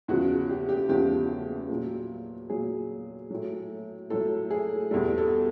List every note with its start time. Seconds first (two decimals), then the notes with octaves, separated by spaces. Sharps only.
0.08 E2 C#3 F3 F#4
0.49 G4
0.69 G4
0.89 E2 C#3 F3 G4
1.69 A#2 F#3
2.50 A#2 F#3 G#4
3.30 A2 F#3
4.10 A2 F#3 A4
4.51 G#4
4.91 E2 B2 G3 A4
5.18 A4